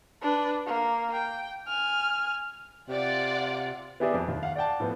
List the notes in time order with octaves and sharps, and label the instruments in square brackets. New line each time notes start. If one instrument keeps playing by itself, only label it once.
[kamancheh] D4 B4
A#3
G5
G#5 F6
[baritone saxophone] C3 [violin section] F4 D5 F#5
[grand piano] B3 E4 G4 G#4 D5 E5
F2
D#2
F5 F#5
D5 F#5 G5 A5
A2 F3 B3